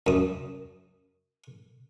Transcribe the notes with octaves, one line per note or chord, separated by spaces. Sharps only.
F#2 D#6